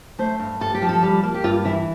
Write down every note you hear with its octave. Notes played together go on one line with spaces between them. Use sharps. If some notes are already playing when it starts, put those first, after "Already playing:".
A3 C5
G2
G2 A4
G4
F3
A4
G3
A#3
G4
G2 F4
E3 E4